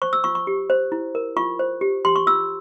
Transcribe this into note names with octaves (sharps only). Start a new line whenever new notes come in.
C5 C#6
E6
F4 C#6
C#6
G4
C5
E4
A#4
F4 C#6
C5
G4
G4 C6
C#6
F4 E6